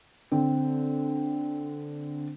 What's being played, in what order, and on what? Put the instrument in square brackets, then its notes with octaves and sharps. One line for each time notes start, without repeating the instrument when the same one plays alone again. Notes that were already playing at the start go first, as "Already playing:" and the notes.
[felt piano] D3 C4